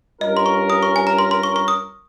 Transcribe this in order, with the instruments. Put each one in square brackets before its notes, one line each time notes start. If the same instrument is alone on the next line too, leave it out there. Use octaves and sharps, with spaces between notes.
[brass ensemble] G2 G3 C#4 F4 A#4 [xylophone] D#5
[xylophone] C6
C#6
D#6
C#6
G#5
A#5
C6
C6
C#6
C#6
D#6